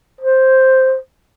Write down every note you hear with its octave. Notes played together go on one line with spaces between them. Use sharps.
C5